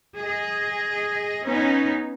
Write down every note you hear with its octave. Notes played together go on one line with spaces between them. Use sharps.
G#4 D#5
B3 C#4 D#4